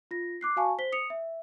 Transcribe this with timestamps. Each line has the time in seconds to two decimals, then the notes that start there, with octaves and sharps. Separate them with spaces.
0.11 F4 A#6
0.41 D6 F#6 C7
0.56 F#4 F5 G#5 A5 C#6
0.78 C5 B6 G7
0.92 D#6 C#7 F7
1.10 E5